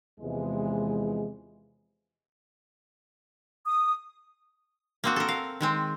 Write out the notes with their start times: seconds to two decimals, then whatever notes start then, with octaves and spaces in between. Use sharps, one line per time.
0.20 E2 C3 E3 F3 G#3
3.66 D#6
5.04 A#3 C4 F#4
5.16 A4 A#4
5.29 F5
5.61 D#3 G#3 C4